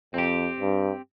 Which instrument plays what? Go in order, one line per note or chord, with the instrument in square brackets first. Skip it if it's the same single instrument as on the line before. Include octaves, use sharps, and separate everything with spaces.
[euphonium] F2 [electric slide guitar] C4 G4
[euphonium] G2